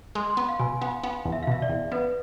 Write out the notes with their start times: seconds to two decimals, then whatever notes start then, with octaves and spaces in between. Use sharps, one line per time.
0.15 G#3 C6
0.30 C6
0.37 B3 B5
0.49 F5
0.59 B2 G#5
0.81 B3 F5
1.03 B3 F5
1.25 E2
1.32 E5
1.43 F5
1.47 B2 E5
1.62 D5
1.69 E2
1.92 B3 B4